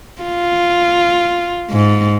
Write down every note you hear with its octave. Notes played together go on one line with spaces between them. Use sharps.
F4
G#2